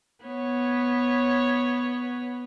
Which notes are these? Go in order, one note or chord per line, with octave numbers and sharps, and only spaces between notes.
B3 C#5